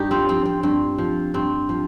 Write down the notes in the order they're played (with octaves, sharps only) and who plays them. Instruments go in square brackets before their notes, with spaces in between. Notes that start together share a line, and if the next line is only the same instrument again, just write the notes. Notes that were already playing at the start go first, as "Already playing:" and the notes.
Already playing: [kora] G2 D#4 G4
C4 F4
F3 C4
C4
G2 C4
F3
G2 C4
F3